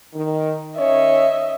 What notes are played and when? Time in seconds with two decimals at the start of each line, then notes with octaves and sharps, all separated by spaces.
0.14 D#3
0.77 D#3 C#4 C#5 D#5 E5